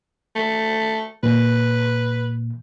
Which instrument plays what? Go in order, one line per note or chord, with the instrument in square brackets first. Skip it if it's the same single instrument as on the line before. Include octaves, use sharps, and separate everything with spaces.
[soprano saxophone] A3
[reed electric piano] A#2 [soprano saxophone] B4